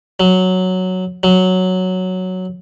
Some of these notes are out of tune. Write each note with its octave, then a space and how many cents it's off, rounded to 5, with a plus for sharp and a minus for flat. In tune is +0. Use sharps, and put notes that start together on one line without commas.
F#3 +0
F#3 +0